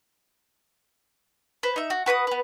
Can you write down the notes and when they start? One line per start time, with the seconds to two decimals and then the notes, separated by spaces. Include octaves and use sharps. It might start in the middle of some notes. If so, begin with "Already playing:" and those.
1.63 B4 C5
1.76 D#4 E5
1.90 F#4
2.06 F#4 B4 C#6 D#6
2.27 B3 B4